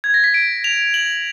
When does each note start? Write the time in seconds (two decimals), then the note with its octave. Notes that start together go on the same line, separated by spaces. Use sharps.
0.04 G#6
0.14 A#6
0.24 B6
0.34 D7
0.64 F7
0.94 F#7